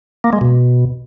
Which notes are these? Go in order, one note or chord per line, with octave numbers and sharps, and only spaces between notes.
A#3
G#3
B2